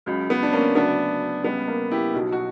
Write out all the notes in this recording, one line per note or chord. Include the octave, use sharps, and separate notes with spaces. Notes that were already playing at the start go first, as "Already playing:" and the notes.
C#2 C#3 F#3
B3
D4
A#3 C#4
D2 C#3 F#3 B3 D4
C#2 C#3 G3 B3
A#3
E4 G4
B1 B2 F#3
F#4